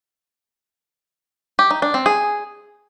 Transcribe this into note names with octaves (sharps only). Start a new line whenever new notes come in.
G4
D#4
D4
C4
G#4